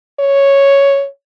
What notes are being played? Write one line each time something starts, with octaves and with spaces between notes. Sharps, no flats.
C#5